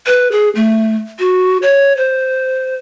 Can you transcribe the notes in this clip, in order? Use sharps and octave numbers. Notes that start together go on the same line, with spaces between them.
B4
G#4
A3
F#4
C#5
C5